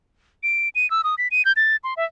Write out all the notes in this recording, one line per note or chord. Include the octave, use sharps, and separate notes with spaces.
D7
D#7
E6
D#6
B6
D#7
G6
A6
C6
E5